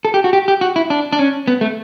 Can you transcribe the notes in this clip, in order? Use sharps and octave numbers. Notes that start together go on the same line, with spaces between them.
A4
G4
F#4
G4
G4
F#4
E4
D4
D4
C#4
B3
A3